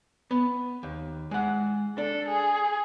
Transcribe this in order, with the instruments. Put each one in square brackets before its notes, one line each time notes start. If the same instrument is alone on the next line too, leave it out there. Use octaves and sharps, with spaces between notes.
[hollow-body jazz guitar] B3
D#2
G#3 F#5
[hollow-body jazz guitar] D4 [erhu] A4
[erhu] G#4